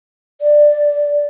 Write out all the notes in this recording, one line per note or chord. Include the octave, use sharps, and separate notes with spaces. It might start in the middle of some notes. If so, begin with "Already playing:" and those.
D5